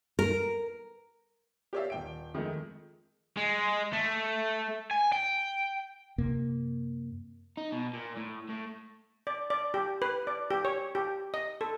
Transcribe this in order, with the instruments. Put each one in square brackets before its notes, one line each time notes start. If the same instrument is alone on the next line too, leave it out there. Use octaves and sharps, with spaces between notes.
[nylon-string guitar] A#4
[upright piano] G4 A#4 C#5 D5 E5 F5
D#1 G5 D7
F2 D#3 G#3 A3
[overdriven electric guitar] G#3
A3
G#5
G5
[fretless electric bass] F#2 C3 A#3
[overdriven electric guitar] D#4
B2
A#2
A2
A2
[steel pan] D5
D5
G4
B4
D5
G4
C#5
G4
D#5
A4